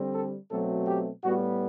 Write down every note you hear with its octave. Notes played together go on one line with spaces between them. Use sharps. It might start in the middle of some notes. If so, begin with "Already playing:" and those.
Already playing: D3 G3 C4
A4
B2 F#3 A3 C4 A4
G4
A2 G3 B3 F#4